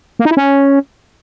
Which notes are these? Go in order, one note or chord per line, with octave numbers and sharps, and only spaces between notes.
A#3
D#4
E4
C#4